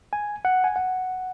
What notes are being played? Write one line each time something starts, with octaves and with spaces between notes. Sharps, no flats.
G#5
F#5
G#5
F#5